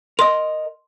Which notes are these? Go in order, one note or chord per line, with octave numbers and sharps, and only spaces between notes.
A#4 D#5 C6